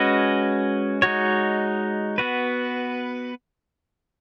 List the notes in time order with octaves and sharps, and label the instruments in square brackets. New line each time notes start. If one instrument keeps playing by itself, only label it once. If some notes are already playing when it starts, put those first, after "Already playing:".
Already playing: [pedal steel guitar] G#3 C#4 F#4 B4 D#5
G#3 D#4 F#4 C#5
B3 F#4 B4